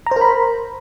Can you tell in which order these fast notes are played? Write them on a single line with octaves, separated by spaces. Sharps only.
A#5 C5 A#4 B5